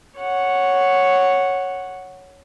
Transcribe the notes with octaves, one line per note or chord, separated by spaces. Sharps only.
C#5 F#5